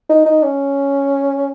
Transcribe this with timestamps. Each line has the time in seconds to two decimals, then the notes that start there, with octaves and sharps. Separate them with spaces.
0.10 D#4
0.26 D#4
0.43 C#4